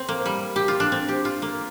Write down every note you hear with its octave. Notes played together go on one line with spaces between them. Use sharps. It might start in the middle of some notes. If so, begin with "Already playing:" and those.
Already playing: C4
A#3
G3
G4
F4
D4
C4
G4
F4
A#3